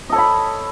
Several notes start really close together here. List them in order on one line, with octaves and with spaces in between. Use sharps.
D#5 A4 C#5 B5